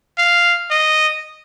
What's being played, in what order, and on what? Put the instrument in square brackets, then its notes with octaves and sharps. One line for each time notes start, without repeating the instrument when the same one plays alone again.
[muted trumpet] F5
D#5